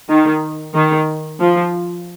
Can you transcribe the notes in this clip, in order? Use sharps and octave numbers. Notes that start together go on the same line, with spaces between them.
D#3
D#3
F3